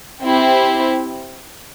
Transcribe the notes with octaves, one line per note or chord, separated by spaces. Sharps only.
C4 E4 G4